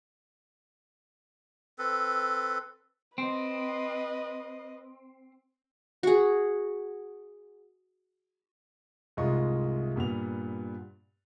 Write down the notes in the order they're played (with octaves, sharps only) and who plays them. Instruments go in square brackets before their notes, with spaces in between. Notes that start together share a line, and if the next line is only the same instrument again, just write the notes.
[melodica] C4 A4 B4
[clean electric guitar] C4 [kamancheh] B4 D#5
[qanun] F#4 G#4
[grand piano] C2 G#2 F4 D#5 C#6
G2 A#2 B3 F7